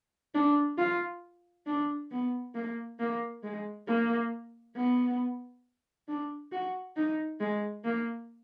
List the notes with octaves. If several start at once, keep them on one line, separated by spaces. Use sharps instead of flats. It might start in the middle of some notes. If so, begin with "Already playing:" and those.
D4
F4
D4
B3
A#3
A#3
G#3
A#3
B3
D4
F#4
D#4
G#3
A#3